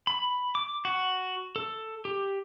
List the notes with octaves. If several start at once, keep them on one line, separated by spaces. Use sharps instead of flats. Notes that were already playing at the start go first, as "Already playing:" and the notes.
B5
D6
F#4
A4
G4